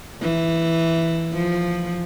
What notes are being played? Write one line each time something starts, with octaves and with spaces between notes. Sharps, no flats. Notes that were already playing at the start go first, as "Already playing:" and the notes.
E3
F3